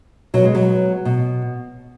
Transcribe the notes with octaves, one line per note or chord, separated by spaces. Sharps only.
B2 F#3
G#3
F#3
B2